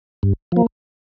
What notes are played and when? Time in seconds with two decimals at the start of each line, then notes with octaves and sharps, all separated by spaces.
0.23 G2
0.52 F3 A#3